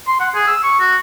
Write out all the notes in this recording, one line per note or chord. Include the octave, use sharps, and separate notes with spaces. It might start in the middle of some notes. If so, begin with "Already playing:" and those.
C6
F#5
G#4
E6
C#6
F#4